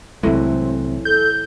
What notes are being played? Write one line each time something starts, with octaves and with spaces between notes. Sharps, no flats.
C2 A2 E3 F#3 G#3 C4
A4 G6